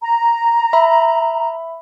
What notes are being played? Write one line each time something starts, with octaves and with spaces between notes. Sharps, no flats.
A#5
E5 B5